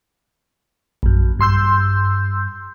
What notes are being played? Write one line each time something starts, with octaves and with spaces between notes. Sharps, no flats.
A#1 F#2
G2 C6 E6 G6